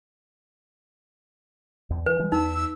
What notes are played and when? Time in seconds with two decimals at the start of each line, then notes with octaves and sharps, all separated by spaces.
1.90 E2
2.06 E3 B4
2.19 E3 G3 G#3
2.32 E2 D#4 E6